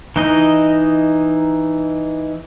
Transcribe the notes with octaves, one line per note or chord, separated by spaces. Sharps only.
E3 D#4 D#5